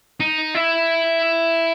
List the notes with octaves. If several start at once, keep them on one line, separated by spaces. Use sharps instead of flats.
D#4
E4